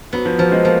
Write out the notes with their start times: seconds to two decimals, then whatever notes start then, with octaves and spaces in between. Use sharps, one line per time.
0.13 F#3 B3
0.25 F3
0.38 F3 F#3
0.52 G#3
0.64 F3 A#3